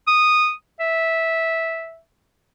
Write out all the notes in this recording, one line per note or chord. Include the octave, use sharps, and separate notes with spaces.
D#6
E5